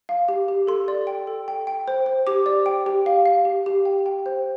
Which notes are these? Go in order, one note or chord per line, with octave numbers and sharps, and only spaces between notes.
F5
G4
G4
A4 C6
D5
G5
A4
G5
G5
C5
C5
G4 D6
D5
G5
G4
F5
F5
G4
G4
G5
G5
C5